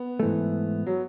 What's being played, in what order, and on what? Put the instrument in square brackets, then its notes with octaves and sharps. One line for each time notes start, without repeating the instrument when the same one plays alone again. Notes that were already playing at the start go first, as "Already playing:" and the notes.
Already playing: [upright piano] B3
[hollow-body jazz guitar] G#2 E3 A3
[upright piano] F#3